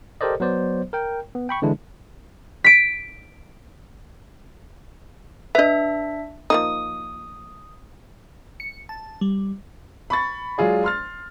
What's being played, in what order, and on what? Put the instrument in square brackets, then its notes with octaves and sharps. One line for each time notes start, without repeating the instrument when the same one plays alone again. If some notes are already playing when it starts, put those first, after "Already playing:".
[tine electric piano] G4 A4 A#4 C5 D5 D#5
F#3 B3 C5 D5
A#4 G5
B3
G5 B5 C#6
D3 E3 G#3 D4 E4
[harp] B6 D7
[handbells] D4 E5 [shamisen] B4 D#5
[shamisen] F3 A#3 D#4 [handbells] D#6
[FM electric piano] C#7
A5
G3
[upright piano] B5 C#6 A6
F#3 G#3 F4 G#4 D5
C6 F6 A6